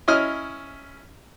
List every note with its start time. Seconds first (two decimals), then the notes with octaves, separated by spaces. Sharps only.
0.08 C#4 E4 D#5 D#6 F6